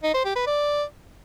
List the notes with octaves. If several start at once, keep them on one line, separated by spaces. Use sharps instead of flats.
D#4
C5
G4
B4
D5